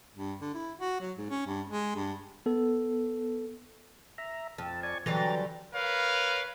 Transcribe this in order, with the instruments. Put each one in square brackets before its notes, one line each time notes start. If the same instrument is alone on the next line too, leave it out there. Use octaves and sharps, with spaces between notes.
[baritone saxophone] G2
D3
E4
F#4
F#3
G#2
C#4
G2
G#3
G2
[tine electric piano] B3 A4
[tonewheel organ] E5 A#5
[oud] F2 [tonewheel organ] A5
[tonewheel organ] D5 G#5 C#6
[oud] D3 F#3 G3 [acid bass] E3 [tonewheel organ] A#5 A6
[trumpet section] A#4 B4 C#5 F5